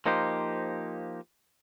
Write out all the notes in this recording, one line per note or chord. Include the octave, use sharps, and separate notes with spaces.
F3 A#3 D#4 G4 C5